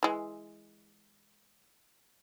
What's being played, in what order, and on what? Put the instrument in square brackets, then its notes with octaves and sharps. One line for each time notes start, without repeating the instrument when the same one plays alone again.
[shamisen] E3 G#3